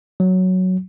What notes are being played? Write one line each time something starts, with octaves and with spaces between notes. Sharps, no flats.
F#3